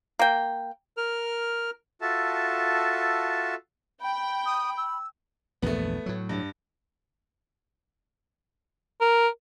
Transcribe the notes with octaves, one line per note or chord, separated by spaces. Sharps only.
A#3 G5
A#4 F6
F4 F#4 A4 E5 A5
G5 B5
D#6
E6
A#1 E2 G2 A3 B3
A2 F#3
G2
A#4